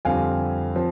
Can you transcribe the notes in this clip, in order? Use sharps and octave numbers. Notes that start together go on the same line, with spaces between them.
F2 D3 G3 C4 F5 G#5
F3 C4